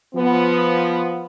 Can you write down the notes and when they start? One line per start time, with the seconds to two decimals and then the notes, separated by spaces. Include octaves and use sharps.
0.15 F3 B3